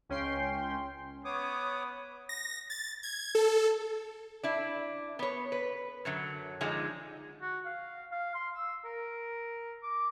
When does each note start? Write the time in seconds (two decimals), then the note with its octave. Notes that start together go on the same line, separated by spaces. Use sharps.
0.09 C#2 C#4 G5 C6
1.25 B3 C#5 D6 D#6
2.29 A#6
2.70 A6
3.03 G#6
3.35 A4
4.43 D4 E4
5.19 B3 C#5
5.52 B4
6.05 F#2 D3 F#3
6.61 D3 F3 G#3 D#4
7.42 F#4
7.65 F5
8.12 F5
8.35 C6
8.55 E6
8.85 A#4
9.83 D6